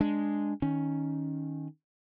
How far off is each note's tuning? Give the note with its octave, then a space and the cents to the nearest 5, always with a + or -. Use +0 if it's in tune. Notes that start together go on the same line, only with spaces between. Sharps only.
G#3 +0 D4 +0
D#3 +0 C#4 +5